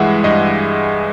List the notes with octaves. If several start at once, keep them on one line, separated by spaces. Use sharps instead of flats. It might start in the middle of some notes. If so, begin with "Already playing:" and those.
Already playing: G2 E3 G#3 E5 F#5
G2 D#5